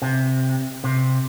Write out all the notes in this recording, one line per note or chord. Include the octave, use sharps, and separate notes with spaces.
C3
C3